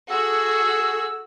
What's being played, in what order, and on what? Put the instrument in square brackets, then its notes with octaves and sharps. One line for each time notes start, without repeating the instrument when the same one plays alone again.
[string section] F#4 [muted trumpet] G#4 [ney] A4 [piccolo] E6